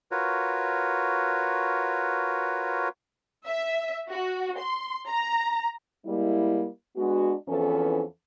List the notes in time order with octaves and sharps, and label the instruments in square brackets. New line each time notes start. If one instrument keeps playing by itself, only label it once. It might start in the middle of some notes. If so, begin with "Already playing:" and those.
[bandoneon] F4 F#4 A#4 B4 C#5
[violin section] E5
F#4
C6
A#5
[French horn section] G3 G#3 A#3 E4
G#3 B3 D4 F#4
E2 E3 F3 C4 C#4 A4